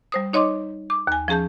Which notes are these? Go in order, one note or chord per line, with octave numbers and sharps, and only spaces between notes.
G3 C5 D#6
D#4 C#5 D#5 C6 D6
D6
D#2 G#5
F3 C#4 G#4 A5 G6